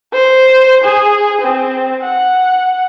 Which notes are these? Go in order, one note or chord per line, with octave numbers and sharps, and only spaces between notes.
C5
G#4
C4
F#5